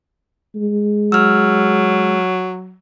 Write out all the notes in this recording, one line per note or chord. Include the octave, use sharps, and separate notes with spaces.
G#3
F#3 E6 F6